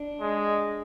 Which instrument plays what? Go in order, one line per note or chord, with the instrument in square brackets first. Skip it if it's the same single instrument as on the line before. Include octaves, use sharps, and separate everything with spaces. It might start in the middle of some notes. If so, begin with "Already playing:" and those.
Already playing: [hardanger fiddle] D4
[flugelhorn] G#3